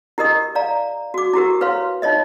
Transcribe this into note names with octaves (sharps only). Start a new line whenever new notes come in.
E4 G4 A#4 D#5 D#6
D5 F5 A#5
F#4 D6
E4 F#4 G4 A#4
E4 B4 C#5 F5 C6
D#4 F4 C#5 D#5 E5